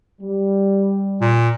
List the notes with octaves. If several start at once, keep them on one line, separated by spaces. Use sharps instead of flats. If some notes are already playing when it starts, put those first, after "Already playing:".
G3
A#2